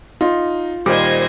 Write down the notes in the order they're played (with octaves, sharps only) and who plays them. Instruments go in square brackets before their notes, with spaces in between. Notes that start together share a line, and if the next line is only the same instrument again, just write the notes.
[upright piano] D#4 [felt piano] F4
[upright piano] A#2 D#3 G3 [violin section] C5 D#5 G#6 [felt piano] D6